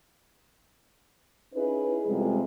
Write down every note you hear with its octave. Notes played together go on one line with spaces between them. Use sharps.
C#4 D#4 E4 G#4 B4
F2 C3 G3 G#3